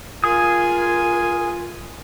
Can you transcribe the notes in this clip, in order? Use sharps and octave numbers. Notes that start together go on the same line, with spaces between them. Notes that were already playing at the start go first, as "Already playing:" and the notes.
F4 G#4 A#4 G#5 D#6